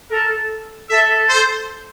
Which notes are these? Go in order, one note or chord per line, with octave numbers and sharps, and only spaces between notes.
A4 A#4
A4 E5
C5